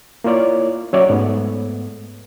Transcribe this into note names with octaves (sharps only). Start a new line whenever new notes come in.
A#3 E4 F4 C#5 D5
F#3 C#4 C#5 D5 E5
G#2 A3 B3